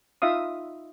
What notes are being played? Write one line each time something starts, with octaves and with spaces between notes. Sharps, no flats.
D#4 F4 E5 F5 D#6